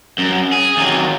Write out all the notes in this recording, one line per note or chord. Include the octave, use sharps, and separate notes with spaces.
F#2
G#4
D#2 F#3